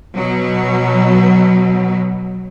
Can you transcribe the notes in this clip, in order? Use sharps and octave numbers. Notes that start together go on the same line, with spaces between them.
B2 F#3